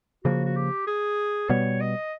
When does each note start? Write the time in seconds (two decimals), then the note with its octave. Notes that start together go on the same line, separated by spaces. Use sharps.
0.24 C#3 F3 A#3 F#4
0.45 F#4
0.56 G4
0.87 G#4
1.49 B2 G3 B3 C#5
1.81 D#5